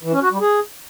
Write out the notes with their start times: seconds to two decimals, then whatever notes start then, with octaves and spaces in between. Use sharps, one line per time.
0.03 E3
0.13 C#4
0.22 F#4
0.31 G3
0.41 G#4